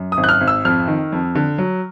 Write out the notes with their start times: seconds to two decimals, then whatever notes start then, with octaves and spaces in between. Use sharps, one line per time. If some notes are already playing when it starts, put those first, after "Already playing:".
Already playing: F#2
0.12 D#6
0.17 G#1
0.24 F#6
0.29 F6
0.41 G#1
0.48 E6
0.65 F2 F6
0.88 D#3
1.12 F2
1.35 D3
1.58 F#3